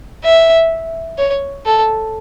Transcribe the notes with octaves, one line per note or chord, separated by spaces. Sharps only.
E5
C#5
A4